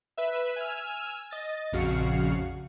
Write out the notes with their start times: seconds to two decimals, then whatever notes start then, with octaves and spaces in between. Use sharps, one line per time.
0.18 B4 E5
0.56 G#5 E6 F6
1.31 D#5 A6
1.72 A#1 F2 C#3 F#4 F5 C#7